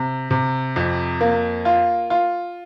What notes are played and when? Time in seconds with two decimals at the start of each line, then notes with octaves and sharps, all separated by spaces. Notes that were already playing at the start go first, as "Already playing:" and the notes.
Already playing: C3
0.31 C3
0.76 F2
1.21 A#3
1.65 F4
2.10 F4